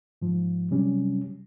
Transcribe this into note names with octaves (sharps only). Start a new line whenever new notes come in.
G#2 F3
C3 F#3 G3 C#4